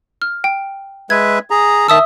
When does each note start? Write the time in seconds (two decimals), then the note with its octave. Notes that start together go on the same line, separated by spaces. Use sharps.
0.22 F6
0.44 G5
1.10 G#3 B4 E5 G#6
1.50 G#4 A#5
1.88 D#3 E5 A5 D#6 E6